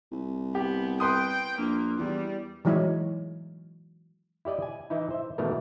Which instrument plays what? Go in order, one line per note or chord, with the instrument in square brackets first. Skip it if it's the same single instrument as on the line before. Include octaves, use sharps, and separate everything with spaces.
[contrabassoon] C2
[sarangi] B3 [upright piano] G4
[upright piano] B4 C6 D#6 [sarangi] G5
[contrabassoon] A#1 [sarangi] A#3
[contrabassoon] E2 [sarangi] G3
[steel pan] E3 F#3 G#3 E4 C#5
[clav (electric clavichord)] E4 G4 D5 D#5
G#5
E3 D#4 E4
C5 E5
B2 D#3 E3 G#3 A3 A#4